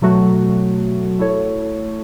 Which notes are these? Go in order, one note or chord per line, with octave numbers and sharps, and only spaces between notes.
B2 F#3 A3 F#4
A3 E4 A4 C#5